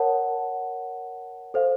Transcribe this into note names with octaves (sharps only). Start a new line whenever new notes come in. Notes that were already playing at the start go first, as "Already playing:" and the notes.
Already playing: A#4 C#5 F#5 A5
A4 C5 F5